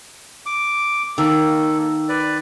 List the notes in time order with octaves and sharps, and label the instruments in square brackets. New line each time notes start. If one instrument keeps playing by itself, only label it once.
[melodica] D6
[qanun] D#3 [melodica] A#3 A4
[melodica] B4 D5